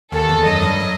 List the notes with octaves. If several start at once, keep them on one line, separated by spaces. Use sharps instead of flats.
D#2 D#3 A4
E2 E3
F#2 F#3 D#5
G2 G3
F#3